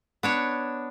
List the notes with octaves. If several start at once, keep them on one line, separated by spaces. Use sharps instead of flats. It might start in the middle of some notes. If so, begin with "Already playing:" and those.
B3 D4 C#5